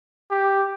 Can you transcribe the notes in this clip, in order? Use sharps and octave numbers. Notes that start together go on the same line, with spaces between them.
G4